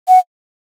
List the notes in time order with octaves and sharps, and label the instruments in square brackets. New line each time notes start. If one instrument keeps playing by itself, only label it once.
[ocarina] F#5